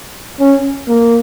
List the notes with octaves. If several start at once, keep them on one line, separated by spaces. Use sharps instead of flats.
C#4
A#3